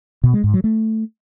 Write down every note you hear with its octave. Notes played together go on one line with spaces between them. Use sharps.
B2
G#3
G#2
F#3
A3